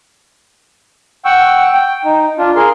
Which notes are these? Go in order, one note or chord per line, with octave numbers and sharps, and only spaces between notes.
F#5 G5 C#6 E6
G5
D#4
D4 F4
G#4 A#4 C6